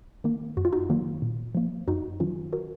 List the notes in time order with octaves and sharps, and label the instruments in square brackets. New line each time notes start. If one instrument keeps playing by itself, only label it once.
[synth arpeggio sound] D#3 A#3
F#2 F#4
F4
D#4 F#4
D#3 F#3 A#3
A#2
F3 A#3
F#2 D#4 F#4
D#3 F#3 C#4 F4
F#4 A#4